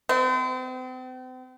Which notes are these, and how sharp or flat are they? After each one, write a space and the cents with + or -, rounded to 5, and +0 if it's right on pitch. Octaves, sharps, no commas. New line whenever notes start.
C4 -40